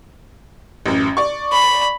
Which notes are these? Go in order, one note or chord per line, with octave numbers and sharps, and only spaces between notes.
A1 F#2
D5 C#6
B5